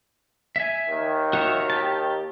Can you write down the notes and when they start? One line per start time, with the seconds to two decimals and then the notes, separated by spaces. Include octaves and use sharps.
0.56 E5 G#5
0.87 D#2 D#3
1.33 F#4 C#5 E5
1.70 G4 A5